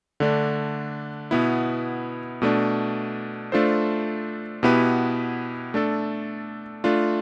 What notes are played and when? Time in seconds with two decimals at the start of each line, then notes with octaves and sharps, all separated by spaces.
0.20 D3 A3 D4
1.31 B2 B3 E4
2.42 B2 A3 D4
3.52 A3 D4 F4 A4 C5
4.63 B2 B3 E4 G4 B4
5.74 A3 D4 A4
6.84 A3 D4 F4